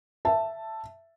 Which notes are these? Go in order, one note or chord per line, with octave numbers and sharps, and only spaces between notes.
E5 A5